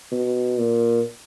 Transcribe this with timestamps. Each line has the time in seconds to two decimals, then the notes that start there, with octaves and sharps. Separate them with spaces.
0.12 B2
0.58 A#2